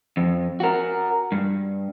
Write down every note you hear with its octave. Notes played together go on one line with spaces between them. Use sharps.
F2
F#4 A#4
G2